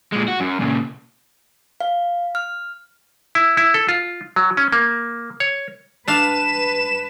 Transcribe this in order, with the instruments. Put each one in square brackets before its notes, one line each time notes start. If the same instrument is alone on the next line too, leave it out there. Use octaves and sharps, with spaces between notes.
[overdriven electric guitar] A#2 G#3
F#4
F#2
A#2 C#3
[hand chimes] F5
F6
[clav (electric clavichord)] E4
E4
A4
F4
F#3
C#4
A#3
C#5
[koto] D4 F5 [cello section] B4 [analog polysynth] E7